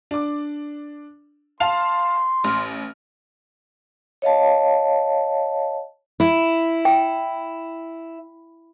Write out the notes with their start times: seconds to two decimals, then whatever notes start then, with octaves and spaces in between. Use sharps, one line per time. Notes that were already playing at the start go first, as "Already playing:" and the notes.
0.11 D4 D6
1.60 F5 A5 C6 F7
2.44 A1 F6
4.22 C#5 D#5 F5 A5
6.20 E4
6.85 G5